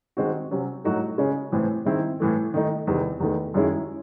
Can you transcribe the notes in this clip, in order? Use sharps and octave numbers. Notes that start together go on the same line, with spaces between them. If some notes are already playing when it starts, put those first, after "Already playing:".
D#3 G#3 C4 F#4
C3 F#3 C#4
A2 F#3 A3 D#4 F#4
C#3 G#3 C#4
A2 E3 C4
D#3 G#3 C4 E4
A2 E3 A3
D#3 A3 D#4
E2 C3 D#3
E2 D#3 A3
F#2 D#3 G#3 C#4 E4